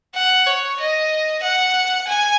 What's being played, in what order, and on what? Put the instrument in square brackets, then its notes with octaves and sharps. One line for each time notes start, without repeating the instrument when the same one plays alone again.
[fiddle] F#5
C#5
D#5
F#5
G#5